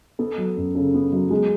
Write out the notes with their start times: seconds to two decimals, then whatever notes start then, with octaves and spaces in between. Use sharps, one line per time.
0.19 B3 A4
0.38 F#3
0.57 F#2
0.75 C#3 A4
0.94 B3
1.13 F#3
1.30 G#3